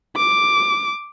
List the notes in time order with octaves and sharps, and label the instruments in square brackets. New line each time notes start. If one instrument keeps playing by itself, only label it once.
[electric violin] D6